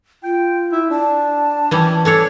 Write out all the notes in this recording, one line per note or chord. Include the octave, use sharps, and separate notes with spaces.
F4 G5
E4
D4 A5
E3 G3 C#4
C#4 D4 A4 C#5